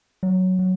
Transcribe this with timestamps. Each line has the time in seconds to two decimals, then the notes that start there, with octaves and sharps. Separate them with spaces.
0.23 F#3
0.59 F#3